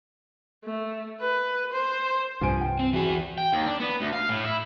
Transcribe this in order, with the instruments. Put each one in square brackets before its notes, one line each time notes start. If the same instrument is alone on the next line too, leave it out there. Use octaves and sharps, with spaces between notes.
[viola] A3
B4
C5
[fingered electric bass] C2 G2 [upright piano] F3 G#5 D7
[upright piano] G5
[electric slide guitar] C4
[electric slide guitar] E3 G#4 [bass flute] F#4
[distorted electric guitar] G5
D#2
D4
B3
D2
F5
A2
E4